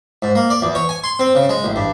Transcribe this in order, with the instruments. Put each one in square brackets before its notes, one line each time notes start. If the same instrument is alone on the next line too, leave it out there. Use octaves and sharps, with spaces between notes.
[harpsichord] G#2
A#3
D5
E2
C#5
G#5
C6
C4
C#3
G#3
A1
G2